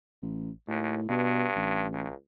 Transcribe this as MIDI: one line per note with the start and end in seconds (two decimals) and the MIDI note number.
0.22 0.50 33
0.68 0.97 39
0.68 1.06 45
1.09 1.85 43
1.09 1.46 47
1.56 2.07 33
1.92 2.13 37